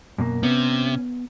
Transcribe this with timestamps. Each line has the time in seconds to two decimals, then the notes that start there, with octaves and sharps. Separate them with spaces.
0.18 F#2 B2 A#3
0.43 C3 B3 C#4